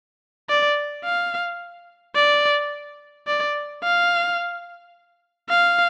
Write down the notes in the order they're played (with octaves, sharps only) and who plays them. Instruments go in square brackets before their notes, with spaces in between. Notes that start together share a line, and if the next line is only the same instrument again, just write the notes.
[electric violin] D5
F5
D5
D5
F5
F5